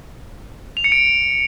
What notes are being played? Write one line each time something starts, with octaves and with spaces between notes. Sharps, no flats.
F7
C#7
D7